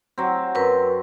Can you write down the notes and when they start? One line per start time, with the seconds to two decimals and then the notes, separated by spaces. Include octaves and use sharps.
0.18 F#3 C4
0.55 F#2 A#4 B4